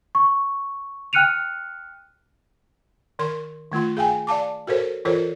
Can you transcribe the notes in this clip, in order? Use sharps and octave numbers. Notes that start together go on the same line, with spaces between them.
C#6
G5 F6 F#6 C#7 D#7 F7
D#3 A#4 C6
D#3 A3 F4 C6
G#4 F5 G5 G#5
D5 F5 A5 D6
F#4 A4 A#4 C5 C#5
E3 F4 A4 A#4 C5 C#5